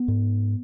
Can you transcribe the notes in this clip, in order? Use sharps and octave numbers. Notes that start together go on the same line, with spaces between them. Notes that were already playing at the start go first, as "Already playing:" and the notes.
Already playing: B3
G#2